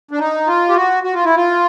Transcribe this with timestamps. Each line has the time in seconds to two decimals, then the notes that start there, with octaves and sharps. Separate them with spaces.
0.11 D4
0.19 D#4
0.47 F4
0.69 G4
0.76 F#4
1.04 F#4
1.14 F4
1.25 E4
1.36 F4